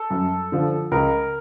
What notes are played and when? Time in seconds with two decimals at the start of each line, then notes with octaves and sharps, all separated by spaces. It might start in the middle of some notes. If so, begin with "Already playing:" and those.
Already playing: A4
0.10 F#2
0.52 D3 F3
0.91 C#2 A#4